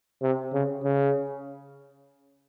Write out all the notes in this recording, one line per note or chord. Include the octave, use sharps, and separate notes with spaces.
C3
C#3
C#3